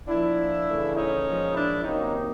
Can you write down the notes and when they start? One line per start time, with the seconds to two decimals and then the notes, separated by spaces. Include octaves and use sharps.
0.08 A#2 F3 A#3 D4 E4
0.66 C#3 E3 A3
0.95 C#4 D#4
1.26 A#2 F3 G#3
1.54 D4 E4
1.83 C3 D#3 F#3 A#3 C#4 D#4